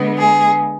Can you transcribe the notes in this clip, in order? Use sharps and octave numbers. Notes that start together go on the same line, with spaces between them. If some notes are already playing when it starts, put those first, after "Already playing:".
Already playing: D3 G#3 B3
G#4